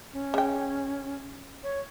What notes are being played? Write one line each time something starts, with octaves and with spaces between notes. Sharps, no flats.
C#4
C#3 G5
C#5